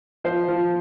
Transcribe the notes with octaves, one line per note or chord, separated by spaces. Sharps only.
F3 C5
F3